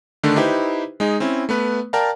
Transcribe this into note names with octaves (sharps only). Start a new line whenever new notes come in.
D3 D#3 A3 D4
D#4 E4 G4 B4 C5
G#3 D#4 G#4
C4 C#4 E4
A3 B3 B4
A#4 D5 F5 G5 A5 A#5